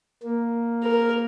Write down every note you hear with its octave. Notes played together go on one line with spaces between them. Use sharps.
A#3
A#4